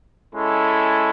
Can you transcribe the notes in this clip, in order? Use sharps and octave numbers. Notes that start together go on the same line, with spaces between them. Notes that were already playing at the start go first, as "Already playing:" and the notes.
G#3 C#4 E4 A4